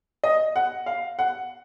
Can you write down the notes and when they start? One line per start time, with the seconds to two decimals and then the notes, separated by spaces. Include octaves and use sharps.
0.24 D#5
0.56 F#5
0.86 F5
1.19 F#5